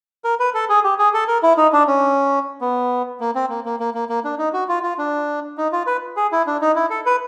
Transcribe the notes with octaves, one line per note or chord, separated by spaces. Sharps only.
A#4
B4
A4
G#4
G4
G#4
A4
A#4
E4
D#4
D4
C#4
B3
A#3
C4
A#3
A#3
A#3
A#3
A#3
D4
D#4
F#4
F4
F4
D4
D#4
F4
B4
G#4
E4
D4
D#4
E4
A4
B4